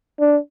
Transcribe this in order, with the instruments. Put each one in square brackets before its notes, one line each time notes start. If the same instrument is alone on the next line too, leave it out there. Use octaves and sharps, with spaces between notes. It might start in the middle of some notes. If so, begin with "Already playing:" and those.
[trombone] D4